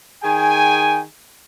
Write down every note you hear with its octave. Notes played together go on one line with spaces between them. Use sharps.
D#3 G#4 G5 G#5